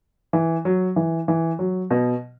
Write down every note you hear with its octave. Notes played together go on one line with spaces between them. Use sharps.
E3
F#3
E3
E3
F#3
B2